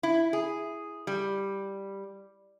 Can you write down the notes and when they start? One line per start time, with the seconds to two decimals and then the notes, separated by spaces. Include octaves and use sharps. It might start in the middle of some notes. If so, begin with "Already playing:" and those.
0.03 E4
0.33 G#4
1.07 G3